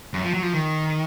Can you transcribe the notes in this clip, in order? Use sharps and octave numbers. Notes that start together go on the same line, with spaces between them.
F#2
F3
F#3
F3
D#3